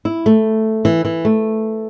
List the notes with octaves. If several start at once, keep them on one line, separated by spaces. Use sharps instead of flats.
E4
A3
E3
E3
A3